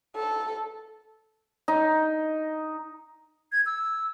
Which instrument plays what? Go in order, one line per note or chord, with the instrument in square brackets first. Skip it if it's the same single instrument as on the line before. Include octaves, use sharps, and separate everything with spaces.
[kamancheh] A4
[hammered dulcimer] D#4
[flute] G#6
E6